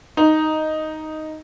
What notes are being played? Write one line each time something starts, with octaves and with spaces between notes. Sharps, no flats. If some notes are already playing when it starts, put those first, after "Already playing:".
D#4